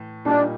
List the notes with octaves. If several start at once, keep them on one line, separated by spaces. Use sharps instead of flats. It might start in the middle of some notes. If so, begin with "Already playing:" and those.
Already playing: A2 E3
A#2 G3 A#3 D4 D#4 G4